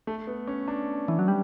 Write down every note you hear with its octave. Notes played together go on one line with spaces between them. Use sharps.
A3
B3
C#4
D4
E3
F#3
G3